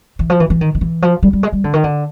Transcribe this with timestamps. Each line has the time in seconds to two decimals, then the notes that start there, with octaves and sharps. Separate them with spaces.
0.19 E3
0.30 F3
0.40 E3
0.50 E3
0.61 D#3
0.75 D#3
0.81 E3
1.02 F3
1.23 G3
1.33 G3
1.43 G#3
1.53 G3
1.64 D3
1.73 D#3
1.84 D3